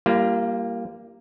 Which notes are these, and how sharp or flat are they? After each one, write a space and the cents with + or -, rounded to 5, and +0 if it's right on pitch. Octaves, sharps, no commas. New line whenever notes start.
G3 +5 A#3 +0 F4 -45